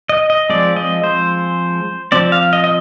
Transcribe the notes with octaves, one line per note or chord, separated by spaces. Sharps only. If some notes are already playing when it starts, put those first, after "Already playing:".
D#5
D#5
F3 G#3 C4 D5
D#5
C5
F3 C4 D5
F5
D#5
D#5